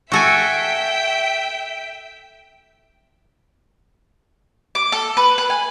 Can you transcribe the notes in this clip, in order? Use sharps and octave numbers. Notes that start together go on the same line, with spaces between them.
F#4 A4 E5 G5 G#5
D6
A4
B4
B4
G#5